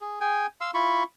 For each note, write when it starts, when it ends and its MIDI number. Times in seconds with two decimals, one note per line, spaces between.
0.01 0.19 68
0.21 0.46 68
0.21 0.46 79
0.21 0.46 80
0.61 0.71 77
0.61 0.71 84
0.61 0.71 88
0.74 1.03 64
0.74 1.03 65
0.74 1.03 83
0.74 1.03 85